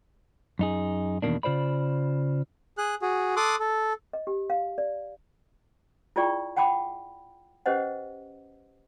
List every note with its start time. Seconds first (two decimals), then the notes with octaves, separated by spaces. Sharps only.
0.59 F#2 D#4 G#4
1.22 E2 B2 D#3 A#3 D4
1.43 C#3 F4 C5 D5 B5
2.78 G#4 F#6
3.02 F#4 G#4
3.36 A4 C6 D6 D#6 F#6
3.59 A4
4.13 D#5
4.27 G4
4.50 F5
4.78 D5
6.16 E4 F4 G#4 D5 G5 C#6
6.57 F#5 G5 A5 B5 D6
7.66 C#4 G4 B4 C5 D#5 F#5